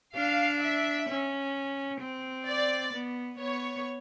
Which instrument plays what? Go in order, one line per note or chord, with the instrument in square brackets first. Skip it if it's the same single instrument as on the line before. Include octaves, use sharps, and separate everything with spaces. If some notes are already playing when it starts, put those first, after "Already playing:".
[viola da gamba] D4 [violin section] F5
[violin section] E5
[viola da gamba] C#4
C4
[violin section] D5
[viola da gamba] B3
[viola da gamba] B3 [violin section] C#5